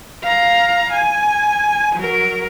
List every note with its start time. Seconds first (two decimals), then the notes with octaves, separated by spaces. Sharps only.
0.23 F5 A#5
0.92 G#5
1.95 F#3 A#4